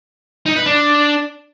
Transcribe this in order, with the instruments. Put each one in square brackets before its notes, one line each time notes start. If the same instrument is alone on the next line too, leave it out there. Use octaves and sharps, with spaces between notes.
[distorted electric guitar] D#4
B4
D4